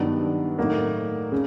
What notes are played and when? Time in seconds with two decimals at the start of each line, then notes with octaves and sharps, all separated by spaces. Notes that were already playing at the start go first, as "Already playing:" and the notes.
Already playing: G2 D#3 F#3 B3 D4
0.58 A2 F#3 A#3 D#4
1.32 C#3